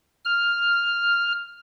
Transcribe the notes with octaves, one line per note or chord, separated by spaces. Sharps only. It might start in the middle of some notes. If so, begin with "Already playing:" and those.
F6